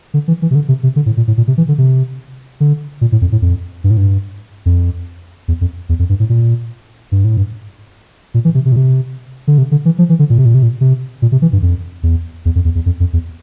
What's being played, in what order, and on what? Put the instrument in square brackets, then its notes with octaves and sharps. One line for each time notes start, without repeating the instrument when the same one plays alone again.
[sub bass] D3
E3
E3
C3
D3
C3
C3
D3
A2
A#2
A2
A#2
C3
E3
D3
C3
D3
A#2
A2
F2
A2
F2
G2
A2
G2
F2
E2
F2
E2
F2
G2
A2
A#2
G2
A2
G2
A#2
E3
C3
C3
A#2
C3
D3
C3
D3
E3
F3
E3
D3
A#2
C3
A#2
C3
A#2
C3
A#2
C3
E3
G2
F2
E2
E2
F2
E2
E2
F2
F2
E2